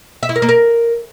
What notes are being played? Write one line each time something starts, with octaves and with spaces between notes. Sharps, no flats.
E5
E4
A#4
A#3
A#4